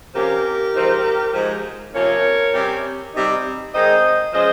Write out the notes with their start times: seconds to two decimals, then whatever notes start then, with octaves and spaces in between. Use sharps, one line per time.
0.14 C3 F3 A#3 C#4 G4 A#4
0.74 G#2 F3 C4 D#4
1.34 G#2 F3 G#3
1.94 C3 F3 A#3 C#4 A#4 C#5
2.54 C3 G3 C#4
3.13 C3 G3 C4 D#4
3.73 D#3 G#3 C4 D#4 C5 D#5
4.33 F3 G#3 C#4 C5 D#5